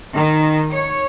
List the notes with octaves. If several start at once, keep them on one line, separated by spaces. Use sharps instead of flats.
D#3
C#5